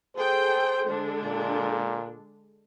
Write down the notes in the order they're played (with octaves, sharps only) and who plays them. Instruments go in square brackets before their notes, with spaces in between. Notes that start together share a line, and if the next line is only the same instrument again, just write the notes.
[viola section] G#4 A4 G5 [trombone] C5
[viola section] D3 G#3 D4
[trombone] A#2